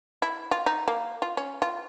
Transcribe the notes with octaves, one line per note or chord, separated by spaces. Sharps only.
E4
F4
D#4
A#3
F4
C#4
F4